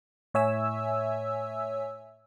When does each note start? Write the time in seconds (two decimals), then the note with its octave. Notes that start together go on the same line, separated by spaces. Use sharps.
0.34 A2 C#5 E5 G#5 E6